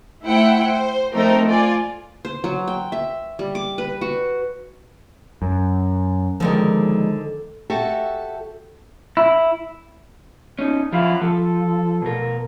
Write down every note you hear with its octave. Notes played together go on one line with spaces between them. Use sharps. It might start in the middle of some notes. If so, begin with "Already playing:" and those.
A3 E4 C5 F#5 G5
C5
F3 A3 C4 D#4 A#4
F4 D5 G#5
C5
F#3
G5
E5
G3
D6
B4
F#4
F#2
D3 D#3 F3 G#3 A#4
F#4 G4 A4 E5 F#5
E4
C#4 D#4
F#2 F3 E4 F5
F3 A4
B2 A#4